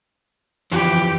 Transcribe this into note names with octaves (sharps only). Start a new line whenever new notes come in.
F2 E3 F3 G4